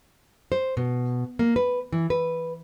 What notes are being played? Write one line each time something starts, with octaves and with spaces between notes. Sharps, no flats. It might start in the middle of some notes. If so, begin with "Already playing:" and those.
C5
B2
A#3
B4
E3
B4